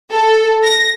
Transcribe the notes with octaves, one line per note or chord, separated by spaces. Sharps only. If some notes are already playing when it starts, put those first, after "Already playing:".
A4
A#6